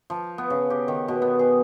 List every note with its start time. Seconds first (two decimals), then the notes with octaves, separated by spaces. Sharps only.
0.10 F3
0.38 B3
0.50 C#3
0.70 G4
0.88 D#3
1.08 B2
1.22 B3
1.39 G#4